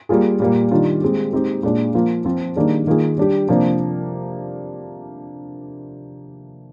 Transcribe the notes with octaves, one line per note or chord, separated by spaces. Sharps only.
G3 A#3 F4 G#4
A#2 G3 A#3
D#3 G3 D4 F4
G#3 C4 G4
G#3 C4 D#4 G4
A#2 G#3 D4
F3 A#3 F4
F3 C4 F4
D#3 G3 A#3 D4 G#4
D#3 A#3 F4 G#4
G3 D4 G4
C3 F3 A#3 D4